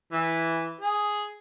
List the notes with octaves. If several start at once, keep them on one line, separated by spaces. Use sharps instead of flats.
E3
G#4